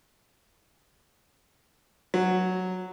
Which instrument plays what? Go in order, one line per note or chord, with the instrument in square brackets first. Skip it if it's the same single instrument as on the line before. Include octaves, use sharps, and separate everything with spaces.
[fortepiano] F#3